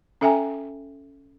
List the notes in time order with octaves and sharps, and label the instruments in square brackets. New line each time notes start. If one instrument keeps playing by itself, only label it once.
[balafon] C#4 A4 E5 G5 G#5 A#5